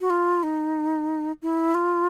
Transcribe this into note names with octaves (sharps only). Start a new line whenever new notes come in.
F#4
F4
D#4
E4
F4